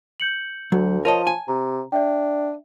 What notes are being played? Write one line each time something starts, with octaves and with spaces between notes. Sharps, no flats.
G6 C#7 F#7
D2 F#3
F3 A#4 C#5 D#5 A5 D#7
G#5
C3 A#5
D4 D5 E5 G5